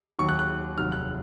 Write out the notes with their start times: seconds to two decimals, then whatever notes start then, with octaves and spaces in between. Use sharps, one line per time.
0.19 D#2 D#3 F#3 C#6
0.29 F#6
0.39 F#6
0.78 F1 D#2 D#3 F#3 F6
0.92 F#6